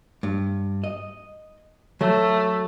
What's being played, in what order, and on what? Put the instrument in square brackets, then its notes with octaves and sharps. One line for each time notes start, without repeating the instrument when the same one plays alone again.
[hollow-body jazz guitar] G2
D#5
[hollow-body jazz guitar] F#3 [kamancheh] A3